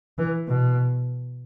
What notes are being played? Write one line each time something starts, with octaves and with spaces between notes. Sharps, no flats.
E3
B2